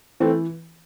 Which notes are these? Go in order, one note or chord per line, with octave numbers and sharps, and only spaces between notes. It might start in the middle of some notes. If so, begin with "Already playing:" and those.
E3 A3 C4